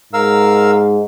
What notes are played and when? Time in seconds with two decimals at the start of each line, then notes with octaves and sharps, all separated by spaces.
0.13 G#2 A#4 F5 E6